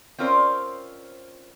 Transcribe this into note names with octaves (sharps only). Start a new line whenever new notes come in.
C4 C#4 F4 A#4 C5 D5